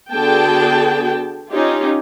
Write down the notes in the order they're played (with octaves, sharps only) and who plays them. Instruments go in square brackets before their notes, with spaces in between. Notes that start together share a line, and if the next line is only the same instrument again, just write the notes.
[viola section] D3 B3 F#4 G#4 G5 A5
C#4 D#4 F4 G4